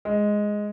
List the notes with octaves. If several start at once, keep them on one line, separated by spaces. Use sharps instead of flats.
G#3